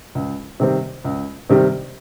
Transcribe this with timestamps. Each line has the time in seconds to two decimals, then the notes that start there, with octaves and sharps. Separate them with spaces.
0.15 C#2
0.60 C3 D#3 G3 C4
1.04 C#2
1.50 C3 D#3 G3 C4